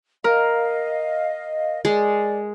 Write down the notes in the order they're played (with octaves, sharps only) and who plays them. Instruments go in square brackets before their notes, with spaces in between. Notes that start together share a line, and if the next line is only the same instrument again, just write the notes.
[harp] A#4 [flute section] D#5 F5
[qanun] G#3 [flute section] D5